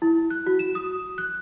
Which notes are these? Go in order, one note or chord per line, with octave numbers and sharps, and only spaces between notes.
E4
F#6
F#4
E7
D#6
F#6